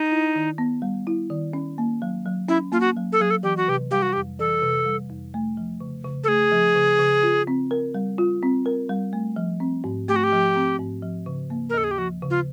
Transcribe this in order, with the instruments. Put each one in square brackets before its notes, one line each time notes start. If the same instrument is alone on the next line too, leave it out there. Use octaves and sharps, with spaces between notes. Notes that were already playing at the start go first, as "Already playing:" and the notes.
Already playing: [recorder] D#4
[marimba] E4
D#3
B3
G3
E4
D#3
C#4
A#3
F#3
F#3
[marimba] C#4 [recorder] E4
[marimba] A#3 [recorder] F4
[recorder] F#4
[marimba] F#3
[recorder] A4
[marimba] F#3 [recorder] G#4
[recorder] A4
[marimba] E3 [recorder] G4
[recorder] F#4
[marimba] C3 [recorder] G4
[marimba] G3 [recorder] G4
[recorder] F#4
G4
[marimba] F2
[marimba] E3 [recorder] A4
[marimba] C3
G3
F2
A3
F3
C#3
C#3
[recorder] A4
[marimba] A3 [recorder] G#4
[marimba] F3
C#3
C#3
F4
C4
A#4
G3
F4
C4
A#4
G3
A3
F3
C4
G#2
[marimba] A3 [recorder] G4
[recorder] F#4
G4
[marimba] F3
C4
G#2
F3
C#3
A#3
[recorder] A#4
[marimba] D#2 [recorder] A4
[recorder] G#4
G4
[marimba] F3 [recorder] F#4
[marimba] C#3
[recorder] F4